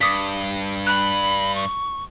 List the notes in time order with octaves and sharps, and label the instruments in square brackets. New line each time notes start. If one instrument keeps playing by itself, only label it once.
[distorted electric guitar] G2 [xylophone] D6 D#6 B6
[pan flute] B5 [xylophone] F#6
[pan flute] C#6